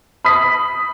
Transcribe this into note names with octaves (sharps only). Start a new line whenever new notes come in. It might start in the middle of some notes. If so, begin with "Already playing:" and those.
B5 D#6 B6